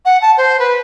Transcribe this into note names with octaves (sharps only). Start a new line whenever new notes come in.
F#5
A5
C5
B4